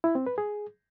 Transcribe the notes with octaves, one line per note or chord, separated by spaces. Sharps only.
E4
C4
B4
G#4